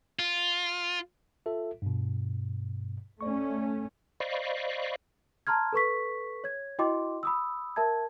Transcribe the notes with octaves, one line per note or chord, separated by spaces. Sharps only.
F4
F4 A4 E5
G2 B2
A3 C#4 D5 C#6
C5 D5 D#5 F5 B5 C#6
A5 A#5 C6 F6 G#6
A4 B4 C#6 B6
C#5 G#6
E4 F#4 D#5 G5 C6 D6
B5 D#6 E6
A#4 E5 A5 G#6